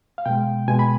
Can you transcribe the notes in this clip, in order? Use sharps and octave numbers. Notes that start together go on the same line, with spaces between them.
F5
B2 G#3 G5
B2 G#3 G#5
B5